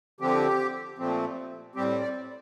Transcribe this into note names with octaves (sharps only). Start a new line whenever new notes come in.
D3 F3 C4 G4
A#2 F3 A3 C4
A2 G3 C4 G4
D5